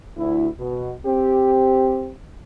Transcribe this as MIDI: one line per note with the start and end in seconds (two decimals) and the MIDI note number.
0.17 0.47 38
0.17 0.47 64
0.58 0.92 47
1.05 2.12 60
1.05 2.12 67